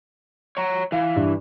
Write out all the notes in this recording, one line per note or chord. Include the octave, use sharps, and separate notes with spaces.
C#5 A#5
E3 F5
G2